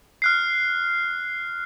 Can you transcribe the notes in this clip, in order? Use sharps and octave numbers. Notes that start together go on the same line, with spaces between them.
F6 F#6 C7